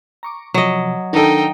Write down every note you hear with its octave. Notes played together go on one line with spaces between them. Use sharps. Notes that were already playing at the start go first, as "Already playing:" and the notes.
A#5 C#6 D6
C3 F3 F#3 D#5
D#3 D4 D#4 A4 G5